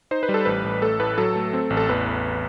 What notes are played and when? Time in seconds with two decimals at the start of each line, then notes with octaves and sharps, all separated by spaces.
0.11 D#4 C5
0.23 B4
0.29 G3
0.34 A4
0.45 A1 B4
0.64 A1
0.82 A3 A4
1.00 A2 B4
1.18 F#3 A4
1.36 A3
1.53 C4
1.70 A1
1.77 A4
1.89 E2 B4
2.06 E2